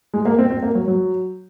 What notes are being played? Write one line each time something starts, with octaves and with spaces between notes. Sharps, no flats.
G#3
A#3
C4
C4
A#3
F#3
F#3